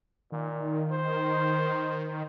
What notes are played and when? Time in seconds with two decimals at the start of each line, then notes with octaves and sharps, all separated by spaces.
0.32 A#2 D#3
0.92 C5